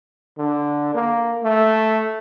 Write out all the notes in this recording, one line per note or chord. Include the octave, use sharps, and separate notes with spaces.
D3
A#3
A3